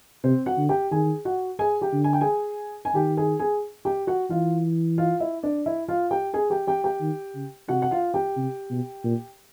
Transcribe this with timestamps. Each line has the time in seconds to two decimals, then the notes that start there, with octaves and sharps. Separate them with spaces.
0.24 C3 C4 C5
0.46 F#4 F#5
0.58 D3
0.69 G4 G5
0.91 D#3 G#4 G#5
1.25 F#4 F#5
1.59 G#4 G#5
1.81 G4 G5
1.93 D3
2.04 G#5
2.13 G5
2.21 G#4 G#5
2.85 G#5
2.95 D#3 G4 G5
3.17 G#4 G#5
3.39 G#4 G#5
3.85 G4 G5
4.07 F#4 F#5
4.30 E3 F4 F5
4.98 F4 F5
5.20 E4 E5
5.43 D4 D5
5.66 E4 E5
5.88 F4 F5
6.11 G4 G5
6.34 G#4 G#5
6.50 G4 G5
6.67 G4 G5
6.84 G4 G5
7.01 D#3
7.35 C#3
7.68 C3 F#4 F#5
7.82 F#5
7.91 F4 F5
8.14 G4 G5
8.37 C3
8.71 B2
9.05 A#2